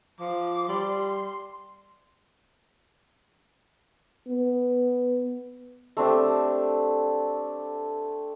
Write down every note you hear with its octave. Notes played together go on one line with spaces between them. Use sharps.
F3 D6
G3 C6
B3
A3 C4 D4 G4